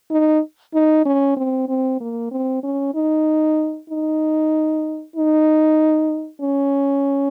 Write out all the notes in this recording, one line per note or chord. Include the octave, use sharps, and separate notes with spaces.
D#4
D#4
C#4
C4
C4
A#3
C4
C#4
D#4
D#4
D#4
C#4